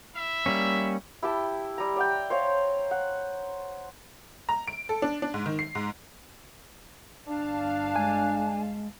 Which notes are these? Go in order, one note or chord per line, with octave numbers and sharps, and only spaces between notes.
E4 E5
G3 A#3 C#4
E4 G4 G5 A5
G3 A#5
D5 F#5 G5
C5 C#5 F5
F#5
A#5
D7
A4
D4
D4
G#2
D#3
C7
G#2
G1 D4 F5 A5
G#3 G#5